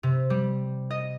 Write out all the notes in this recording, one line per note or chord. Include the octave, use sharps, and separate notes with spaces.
C3
G3
D#5